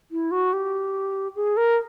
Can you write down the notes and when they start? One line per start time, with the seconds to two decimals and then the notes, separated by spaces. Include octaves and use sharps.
0.11 E4
0.31 F#4
0.53 G4
1.36 G#4
1.57 A#4